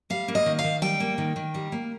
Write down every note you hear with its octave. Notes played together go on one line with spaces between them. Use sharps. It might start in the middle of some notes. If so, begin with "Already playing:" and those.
G3 F5
A#3
D#5
D#3
F5
D#3
G3 G5
A#3
D#3
D#3
G3
A#3